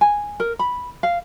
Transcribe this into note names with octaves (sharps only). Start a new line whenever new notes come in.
G#5
A#4
B5
F5